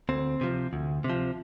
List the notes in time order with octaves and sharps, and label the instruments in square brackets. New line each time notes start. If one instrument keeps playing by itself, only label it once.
[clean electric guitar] D2 C4
C3 F3
D2
C3
F3